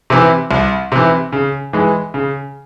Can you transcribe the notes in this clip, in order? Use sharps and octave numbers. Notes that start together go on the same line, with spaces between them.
C3 E3
C2
C3 E3
C#3
E3 G#3
C#3